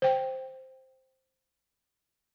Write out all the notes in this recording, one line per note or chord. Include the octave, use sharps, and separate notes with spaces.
C5 G5